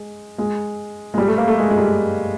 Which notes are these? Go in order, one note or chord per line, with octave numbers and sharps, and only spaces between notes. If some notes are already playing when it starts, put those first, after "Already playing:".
Already playing: G#3
G#3
G#3
G3
A3
A#3
A3
G#3
G#3
G3